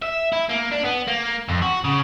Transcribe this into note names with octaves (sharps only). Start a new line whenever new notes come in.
E5
E4
A#3
D4
B3
A#3
F2
F#4
C#3